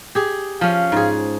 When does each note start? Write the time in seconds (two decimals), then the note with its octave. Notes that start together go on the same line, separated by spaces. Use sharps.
0.15 G4 G#4
0.61 F3 C#4 F5
0.92 G#2 G#4